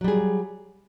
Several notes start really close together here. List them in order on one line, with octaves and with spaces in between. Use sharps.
F#3 G3 G#4